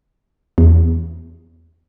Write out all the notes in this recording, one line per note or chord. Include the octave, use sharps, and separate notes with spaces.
E2